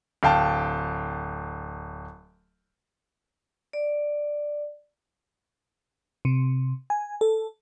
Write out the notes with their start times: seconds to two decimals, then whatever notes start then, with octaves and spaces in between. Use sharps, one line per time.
0.23 D1 F5 G5 A5
3.73 D5
6.25 C3
6.90 G#5
7.21 A4